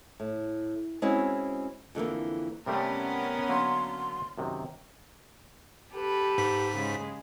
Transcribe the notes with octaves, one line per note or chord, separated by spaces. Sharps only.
A2
G#3 C4 C#4 E4 F#4
F2 D3 E3 A#3
C3 G3 A3 B3 C#4 A#4
D3 F#3 A#3 C6
F#2 C3 D#3
G4 A4 B4
G#2 B6
C#3 G#3